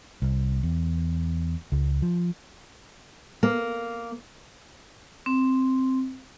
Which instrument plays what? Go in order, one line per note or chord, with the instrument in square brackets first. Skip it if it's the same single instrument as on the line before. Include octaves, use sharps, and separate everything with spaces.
[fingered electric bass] C2
E2
C#2
F3
[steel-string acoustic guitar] A#3
[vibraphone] C4